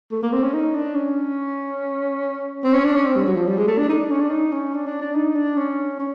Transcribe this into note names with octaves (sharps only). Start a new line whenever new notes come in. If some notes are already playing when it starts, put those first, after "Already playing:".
A3
A#3
C4
C#4
D#4
D4
C#4
C4
C#4
D4
C#4
C4
G3
F#3
F3
G3
G#3
A3
D4
D#4
D4
C#4
D4
D#4
C#4
D4
D4
D4
D#4
D4
C#4
C#4